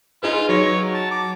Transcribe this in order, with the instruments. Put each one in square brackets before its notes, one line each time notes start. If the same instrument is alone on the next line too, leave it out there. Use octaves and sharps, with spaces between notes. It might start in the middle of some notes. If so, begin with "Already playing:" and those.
[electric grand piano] D#4 G#4 B4 [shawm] F4
[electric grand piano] F#3 A#6 [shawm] C#5
[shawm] A5
D6